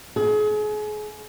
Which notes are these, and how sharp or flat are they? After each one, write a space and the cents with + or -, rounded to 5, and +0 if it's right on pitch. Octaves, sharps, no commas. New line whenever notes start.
G#4 +35